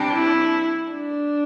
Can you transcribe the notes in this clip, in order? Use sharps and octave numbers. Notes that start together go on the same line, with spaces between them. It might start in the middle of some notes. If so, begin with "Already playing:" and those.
Already playing: C3 G3 D4
E4
D4